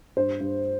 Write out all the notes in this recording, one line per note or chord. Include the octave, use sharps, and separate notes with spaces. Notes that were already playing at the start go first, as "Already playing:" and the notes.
G2 C5
G2